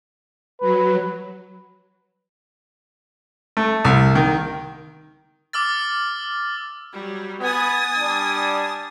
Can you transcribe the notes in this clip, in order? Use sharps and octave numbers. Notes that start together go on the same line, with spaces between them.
F#3 B4
A3
C2
D#3
D6 E6 F6 A6
F#3 G3
B3 G#5 D#6 A6
G3 D4